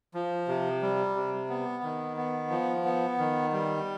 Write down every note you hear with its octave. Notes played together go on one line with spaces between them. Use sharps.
F3
C3
G3
C3
B3
D#3
B3
F3
B3
D#3
G3